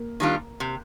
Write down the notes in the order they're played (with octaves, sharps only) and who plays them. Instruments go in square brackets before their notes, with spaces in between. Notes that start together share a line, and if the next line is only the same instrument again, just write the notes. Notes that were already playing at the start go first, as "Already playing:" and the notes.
Already playing: [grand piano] A#3
[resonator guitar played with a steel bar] D#3 G3 D4 F4
C3